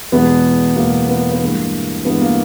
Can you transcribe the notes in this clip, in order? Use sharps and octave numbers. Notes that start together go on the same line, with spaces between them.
E2 B2 G#3 B3
E2 B2 G#3 A#3
B3
B3
G2 E3 G#3 A#3
G2 E3 G#3 B3
A#3